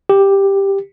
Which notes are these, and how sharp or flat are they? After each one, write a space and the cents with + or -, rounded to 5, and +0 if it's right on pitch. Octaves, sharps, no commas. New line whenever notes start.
G4 +5